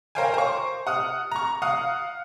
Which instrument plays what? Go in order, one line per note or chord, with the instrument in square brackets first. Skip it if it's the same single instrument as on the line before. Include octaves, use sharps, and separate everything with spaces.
[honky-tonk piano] A#4 C5 C#5 F5 G5 G#5
C5 C#6
F#5 D#6 F6
A#5 C#6
F5 F#5 D#6 F6